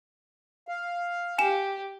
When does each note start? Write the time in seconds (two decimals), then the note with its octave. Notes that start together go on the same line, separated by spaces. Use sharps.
0.68 F5
1.38 G4 G#5 E7